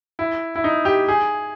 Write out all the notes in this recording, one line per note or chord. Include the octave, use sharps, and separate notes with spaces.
E4
E4
D#4
G4
G#4